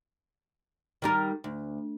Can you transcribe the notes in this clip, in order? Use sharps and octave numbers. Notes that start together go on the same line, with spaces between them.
D#3 G3 A#4
D2